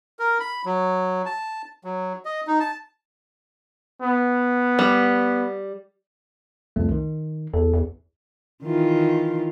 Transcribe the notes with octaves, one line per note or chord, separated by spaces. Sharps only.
A#4
B5
F#3
A5
F#3
D#5
D#4
A5
B3
G3
C2 F2 A3
D#3
E2 A4
E2
D#3 E3 F4